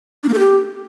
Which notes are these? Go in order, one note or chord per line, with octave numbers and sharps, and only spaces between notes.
D4
A#3
A4
G4